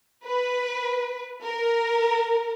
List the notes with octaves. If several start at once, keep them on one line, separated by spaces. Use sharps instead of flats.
B4
A#4